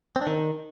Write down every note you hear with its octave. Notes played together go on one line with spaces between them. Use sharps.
C4
D4
D#3